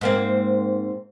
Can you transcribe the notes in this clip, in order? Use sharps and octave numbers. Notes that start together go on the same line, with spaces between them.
G#2 A#3 C4